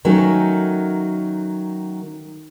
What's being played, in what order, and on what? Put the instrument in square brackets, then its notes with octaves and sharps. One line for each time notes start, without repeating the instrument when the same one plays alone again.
[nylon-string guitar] D#3 F#3 A3 C#4 A#4